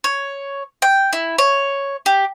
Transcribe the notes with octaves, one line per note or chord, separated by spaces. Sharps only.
C#5
G5
E4
C#5
G4